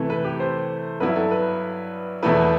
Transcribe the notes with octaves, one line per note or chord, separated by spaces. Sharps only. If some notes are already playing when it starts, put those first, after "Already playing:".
Already playing: C3 E3 A3 E4
B4
G4
C5
G2 F#3 B3 E4 B4
A4
B4
E2 B2 A3 E4 B4